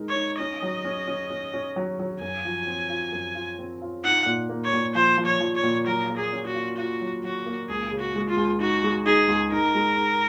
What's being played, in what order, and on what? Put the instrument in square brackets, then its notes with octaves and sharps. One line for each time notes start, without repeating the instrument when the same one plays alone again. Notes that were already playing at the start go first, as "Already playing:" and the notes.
Already playing: [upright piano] G#3 D#4 A#4
[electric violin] C#5
[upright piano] D#4
[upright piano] C#4 [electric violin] D#5
[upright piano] F#3
C#4
C#4
C#4
C#4
F#3
F#3
[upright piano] F#2 [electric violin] G#5
[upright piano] F3
C4
F4
F#2
F4
C4
F4
[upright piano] D#4 [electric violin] F#5
[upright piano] A#2
A#3
[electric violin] C#5
[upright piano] A#2
[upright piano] F3 [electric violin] C5
[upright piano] F3
[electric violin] C#5
[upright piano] F3
[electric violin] C#5
[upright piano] A#2
[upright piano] F#3 [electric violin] A#4
[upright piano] A#3
[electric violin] G#4
[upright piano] C#4
[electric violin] F#4
[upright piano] F4
[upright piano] F4 [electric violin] F#4
[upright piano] F#3
[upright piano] F#3 [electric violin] F#4
[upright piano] A#3
[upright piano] C#2 [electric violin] G#4
[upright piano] C#3
[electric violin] F#4
[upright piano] G#3
[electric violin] F4
[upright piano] C#2
[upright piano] D#4 [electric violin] F#4
[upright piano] G#3
[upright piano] D#4 [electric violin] G#4
[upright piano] C#2
[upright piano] D#4 [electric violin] A#4
[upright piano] G#3
D#4